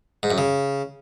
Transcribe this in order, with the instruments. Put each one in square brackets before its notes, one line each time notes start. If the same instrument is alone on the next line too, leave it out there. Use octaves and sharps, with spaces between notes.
[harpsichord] G#2
F#2
C#3